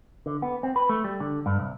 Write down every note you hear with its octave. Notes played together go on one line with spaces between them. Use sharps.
D3
B3
C4
B4
A3
G3
D3
G2
C2